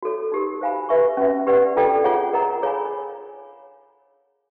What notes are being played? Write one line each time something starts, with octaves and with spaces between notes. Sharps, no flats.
F#4 A4 C#5
D#4 G4 A#4
G4 C5 F5 G#5 B5
G4 B4 E5 G#5 C#6
C#4 F#4 B4 E5
G4 B4 D5 F#5
D4 F4 A4 D5 G5
F4 G#4 C#5 F#5
A#4 D#5 F#5 A#5
G#4 C#5 F5 G#5 B5